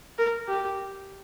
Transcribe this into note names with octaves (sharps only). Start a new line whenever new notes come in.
A#4
G4